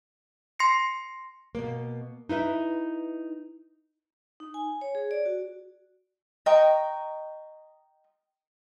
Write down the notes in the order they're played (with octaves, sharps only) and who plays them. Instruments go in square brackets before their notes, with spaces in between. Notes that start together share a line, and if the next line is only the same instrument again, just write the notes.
[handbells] C6 A#6 C7 C#7
[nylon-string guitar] B2 A#3
D#4 E4 B4 E5
[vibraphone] D#4
G#5
C#5
G#4
D5
F#4
[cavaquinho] D#5 G5 A#5 C#6